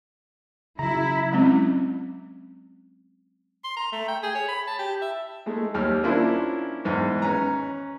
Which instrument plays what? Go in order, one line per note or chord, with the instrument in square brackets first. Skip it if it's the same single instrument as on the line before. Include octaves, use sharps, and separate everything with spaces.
[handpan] C#3 F#3 [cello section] E4 [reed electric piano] A#5
[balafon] F#3 G#3 C4 C#4 E4
[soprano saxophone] C6
A#5
A3
G5
G#4
C#5
B5
A5
G4
E5
[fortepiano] G#3 A3 D#4
D#2 G3 F6
A#3 C#4 D4 E4 F4 C5
E2 G#2
C#4 B4 A#5